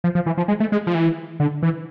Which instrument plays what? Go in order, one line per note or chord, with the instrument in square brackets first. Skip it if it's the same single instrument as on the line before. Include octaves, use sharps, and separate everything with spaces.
[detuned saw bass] F3
F3
E3
F3
G#3
A3
G#3
F3
E3
D3
E3